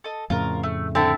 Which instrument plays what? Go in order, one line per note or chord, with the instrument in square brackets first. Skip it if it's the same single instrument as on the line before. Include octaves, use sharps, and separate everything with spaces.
[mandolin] A4 D#5
[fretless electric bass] F2 A2 C#3 [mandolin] F4 A#4
[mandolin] A3
[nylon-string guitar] D3 [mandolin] C4 E4 A5